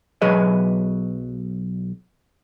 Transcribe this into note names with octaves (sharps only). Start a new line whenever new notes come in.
B1 F#3 G#4 B4 D#5